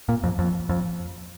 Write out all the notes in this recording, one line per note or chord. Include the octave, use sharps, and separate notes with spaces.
A#2
F2
F2
F2